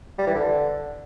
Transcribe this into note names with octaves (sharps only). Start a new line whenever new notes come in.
G3
E3
D3